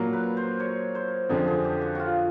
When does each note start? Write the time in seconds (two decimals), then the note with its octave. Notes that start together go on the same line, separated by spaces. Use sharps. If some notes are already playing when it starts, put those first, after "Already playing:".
Already playing: A#2 F#3 A#3
0.13 B4
0.37 C5
0.60 C#5
0.95 C5
1.29 F2 D3 F3 G#4
1.48 G#4
1.64 G4
1.82 F#4
1.95 F4 F#4